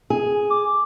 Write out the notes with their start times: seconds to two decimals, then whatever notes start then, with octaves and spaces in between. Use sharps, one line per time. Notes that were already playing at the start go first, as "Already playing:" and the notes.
0.10 G#4
0.50 D6